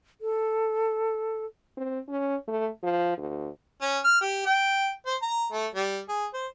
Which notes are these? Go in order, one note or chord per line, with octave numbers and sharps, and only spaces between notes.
A4
C4
C#4
A3
F3
D2
C#4
F6
G4
G5
C5
A#5
A3
G3
G#4
C5